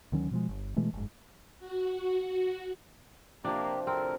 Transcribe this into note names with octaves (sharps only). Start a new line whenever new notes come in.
D2 D#3 F#3 C#4
B2 F3 G#3
G1
B2 E3 G#3 A3
F#1 G#2
F#4
C3 F3 A#3 D4 F4 G4
D2 D3 C4 A#4